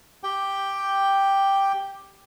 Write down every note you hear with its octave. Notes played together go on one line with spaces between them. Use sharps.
G4 G5